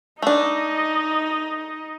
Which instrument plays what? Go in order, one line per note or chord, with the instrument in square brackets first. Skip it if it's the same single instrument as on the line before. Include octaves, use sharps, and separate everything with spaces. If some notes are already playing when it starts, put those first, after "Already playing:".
[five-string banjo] A3 D4 [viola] D#4 D#5